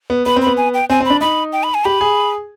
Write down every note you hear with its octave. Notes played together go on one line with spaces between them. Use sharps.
B3
B3 B5
C4
B5
B3
G#5
G5
C4 G#5
C4
D4 B5
D#4 B5
G5
B5
G#5
G4 B5
G#4